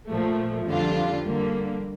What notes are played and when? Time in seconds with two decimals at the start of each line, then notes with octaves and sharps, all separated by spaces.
0.09 A#2 F3 A3
0.67 F2 D3 G3 D4 F4
1.24 D3 G3 A#3